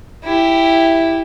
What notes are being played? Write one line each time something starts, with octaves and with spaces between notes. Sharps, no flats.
E4 G4